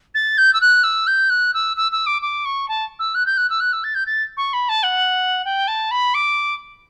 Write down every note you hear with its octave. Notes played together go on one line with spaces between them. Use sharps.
A6
G6
E6
F#6
E6
G6
F#6
E6
E6
E6
D6
D6
C#6
A5
E6
F#6
G6
F#6
E6
F#6
E6
A6
G6
A6
C#6
B5
A5
F#5
G5
A5
B5
D6